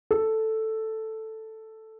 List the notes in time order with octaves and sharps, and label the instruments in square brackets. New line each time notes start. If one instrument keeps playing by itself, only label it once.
[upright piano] A4